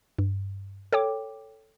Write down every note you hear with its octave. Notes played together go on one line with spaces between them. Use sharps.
G2
A4 C#5 G5 D6